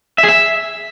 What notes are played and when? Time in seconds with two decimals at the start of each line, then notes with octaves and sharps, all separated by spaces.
0.18 E5
0.23 G#4
0.28 E5